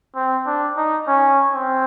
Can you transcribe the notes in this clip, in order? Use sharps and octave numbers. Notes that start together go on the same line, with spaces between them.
C4
D4
D#4
C#4
C4